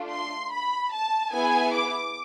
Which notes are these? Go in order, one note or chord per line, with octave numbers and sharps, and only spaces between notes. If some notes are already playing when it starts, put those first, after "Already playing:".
Already playing: A3 D4 F4
C6
B5
A5
B3 E4 G#4 G#5
D6